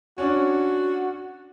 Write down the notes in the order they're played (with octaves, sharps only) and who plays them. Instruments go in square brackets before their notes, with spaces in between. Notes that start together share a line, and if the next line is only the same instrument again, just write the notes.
[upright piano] C#4 D4 [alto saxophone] F#4